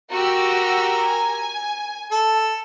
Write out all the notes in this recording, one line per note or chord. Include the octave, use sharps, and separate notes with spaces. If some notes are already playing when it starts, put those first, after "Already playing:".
F#4 G4 A#4 E6
G#5
A4